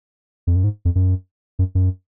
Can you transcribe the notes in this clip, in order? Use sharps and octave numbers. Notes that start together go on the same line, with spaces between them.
F2
F#2
G#2
F2
F#2
F#2
F#2